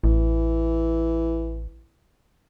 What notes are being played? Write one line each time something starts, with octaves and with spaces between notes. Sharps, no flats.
A1 E3